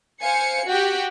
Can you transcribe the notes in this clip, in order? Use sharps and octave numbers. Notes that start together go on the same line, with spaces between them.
C5 F5 G#5 C#7
F#4 G4 G5